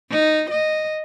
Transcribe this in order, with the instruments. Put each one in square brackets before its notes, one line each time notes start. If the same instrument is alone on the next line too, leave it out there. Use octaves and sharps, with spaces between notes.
[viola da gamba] D#4
D#5